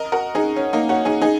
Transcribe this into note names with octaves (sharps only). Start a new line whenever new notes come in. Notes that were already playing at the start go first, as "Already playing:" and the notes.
Already playing: A#4 D#5
F#4 A#4
D#4 G#4
C#4
A#3 D#4
C#4 F#4
D#4 G#4
D#4 G#4